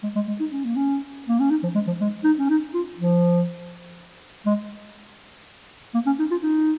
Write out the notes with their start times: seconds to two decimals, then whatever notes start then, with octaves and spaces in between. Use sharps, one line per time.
0.03 G#3
0.16 G#3
0.28 G#3
0.40 D#4
0.52 C#4
0.64 A#3
0.76 C#4
1.28 A#3
1.40 C#4
1.51 D#4
1.63 F3
1.75 G#3
1.87 F3
2.00 G#3
2.24 D#4
2.39 C#4
2.50 D#4
2.74 F4
2.99 F3
4.46 G#3
5.94 A#3
6.06 C#4
6.19 D#4
6.31 F4
6.43 D#4